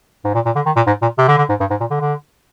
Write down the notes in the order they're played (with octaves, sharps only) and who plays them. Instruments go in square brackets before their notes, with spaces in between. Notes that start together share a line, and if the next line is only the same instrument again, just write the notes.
[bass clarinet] G#2
A#2
A#2
D3
D#3
A#2
G#2
A#2
C3
D3
D3
G#2
G2
G#2
A#2
D3
D3